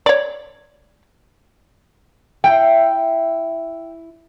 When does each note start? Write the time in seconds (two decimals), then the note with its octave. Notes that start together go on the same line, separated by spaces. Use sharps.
0.06 C#5 D5
2.44 E4 E5 G5